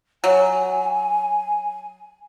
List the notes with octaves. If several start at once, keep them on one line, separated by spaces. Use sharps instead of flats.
F#3 G#5